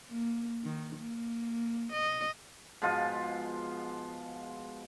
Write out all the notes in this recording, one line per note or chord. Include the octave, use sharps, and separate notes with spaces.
A#3
D#3
A#3
D#5
G#2 B2 F3 F4